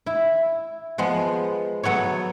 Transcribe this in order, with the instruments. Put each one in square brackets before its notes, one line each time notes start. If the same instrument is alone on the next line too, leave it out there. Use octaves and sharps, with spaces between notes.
[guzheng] E4
F3 G#3 B3
F#3 B3 A4 C#5